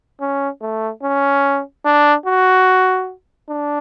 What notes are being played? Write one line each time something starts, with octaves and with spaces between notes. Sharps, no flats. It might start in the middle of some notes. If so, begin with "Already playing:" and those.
C#4
A3
C#4
D4
F#4
D4